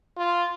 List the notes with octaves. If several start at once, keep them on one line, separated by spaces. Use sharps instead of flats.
F4